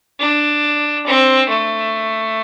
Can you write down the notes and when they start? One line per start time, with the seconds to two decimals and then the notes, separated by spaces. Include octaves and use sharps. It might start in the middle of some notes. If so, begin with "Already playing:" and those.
0.20 D4
1.07 C4
1.49 A3